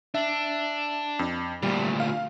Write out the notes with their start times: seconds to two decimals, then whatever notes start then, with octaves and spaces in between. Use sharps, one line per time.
0.14 D4 E5
1.19 F2
1.63 D2 A#2 G3
2.00 F5